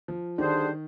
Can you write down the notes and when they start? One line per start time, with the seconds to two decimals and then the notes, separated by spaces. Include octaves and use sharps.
0.08 F3
0.38 D3 D#3 G3 D4 G#4 C5